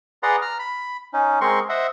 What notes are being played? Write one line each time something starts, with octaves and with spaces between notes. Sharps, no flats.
G#4 B4 D5 F#5 A#5 C6
A#5 F6
B5
C#4 D#4
G#3 C4 A#4 C6 C#6
C5 D#5 E5 F#5